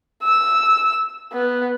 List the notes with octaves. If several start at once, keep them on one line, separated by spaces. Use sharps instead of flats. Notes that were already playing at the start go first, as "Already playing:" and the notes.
E6
B3